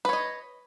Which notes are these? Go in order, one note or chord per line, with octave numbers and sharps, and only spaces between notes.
B4 C#5 D#5